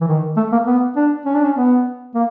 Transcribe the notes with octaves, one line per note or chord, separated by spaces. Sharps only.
E3
D#3
A3
A#3
B3
D4
C#4
D4
C#4
B3
A#3